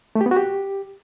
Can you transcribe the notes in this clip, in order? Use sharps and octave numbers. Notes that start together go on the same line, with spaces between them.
A3
G4
B3
F#4
G4